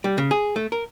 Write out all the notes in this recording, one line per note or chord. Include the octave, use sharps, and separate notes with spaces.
G3
C#3
G#4
A3
A#4